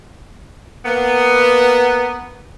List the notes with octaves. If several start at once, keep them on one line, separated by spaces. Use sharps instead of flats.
A#3 B3